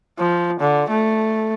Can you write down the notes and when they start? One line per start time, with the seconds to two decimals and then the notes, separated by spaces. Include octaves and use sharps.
0.18 F3
0.60 D3
0.89 A3